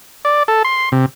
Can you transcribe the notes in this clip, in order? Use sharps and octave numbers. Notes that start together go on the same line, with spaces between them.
D5
A4
C6
C3